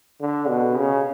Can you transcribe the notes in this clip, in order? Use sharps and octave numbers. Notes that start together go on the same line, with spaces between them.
D3
B2
C#3